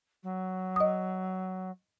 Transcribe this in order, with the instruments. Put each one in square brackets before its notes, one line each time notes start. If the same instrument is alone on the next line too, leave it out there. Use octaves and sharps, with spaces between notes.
[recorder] F#3
[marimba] D#5 D#6